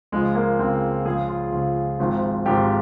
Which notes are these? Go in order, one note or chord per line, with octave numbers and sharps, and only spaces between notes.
C#2 C#3 F3 G#3
A#3
C#2 C#3 F3 C4
C#2 C#3 F3 G#4
F4
C#2 C#3 F3
G#1 G#2 F3
G#1 G#2 F3 G4